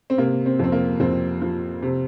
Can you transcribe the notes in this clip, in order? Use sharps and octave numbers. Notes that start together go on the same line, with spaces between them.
C4
C3 A#3
C4
F2 C4
A#3
F2 C4
F3
C3